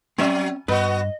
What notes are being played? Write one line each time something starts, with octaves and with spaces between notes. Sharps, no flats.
F#3 C4 C#4 E5
G2 B3 F#4 B4 D#5